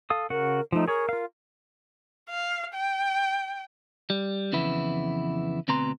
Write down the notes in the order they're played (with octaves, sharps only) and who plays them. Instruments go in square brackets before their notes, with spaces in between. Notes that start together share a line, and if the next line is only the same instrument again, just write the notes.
[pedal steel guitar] A4 F5 D#6
[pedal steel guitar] C#3 F#4 F#5 [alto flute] A#4
[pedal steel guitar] F3 A3 [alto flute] D#4
[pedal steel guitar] G#4 C#5 [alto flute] A#4
[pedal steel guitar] F4 F5
[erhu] F5
G5
[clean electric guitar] G3
F2 C#3 E3 B3 E4
D2 B2 C4 B4 A#5 C6